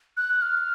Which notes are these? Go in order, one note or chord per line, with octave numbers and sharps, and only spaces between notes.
F#6
F6